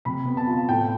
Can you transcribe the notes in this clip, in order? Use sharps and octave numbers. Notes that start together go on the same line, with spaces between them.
C3 B5
B3
A5
F4
A2 G5